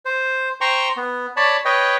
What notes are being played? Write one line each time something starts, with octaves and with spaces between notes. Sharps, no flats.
C5
C5 G5 A#5 C6 C#6
B3
C#5 D5 A5 B5
B4 C#5 D#5 G5